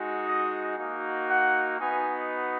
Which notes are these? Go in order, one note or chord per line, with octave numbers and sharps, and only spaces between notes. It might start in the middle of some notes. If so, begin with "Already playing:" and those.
Already playing: G#3 D#4 F#4
D#5
A#3 D#4 F#4
F#5
B3 D#4 F#4 G#5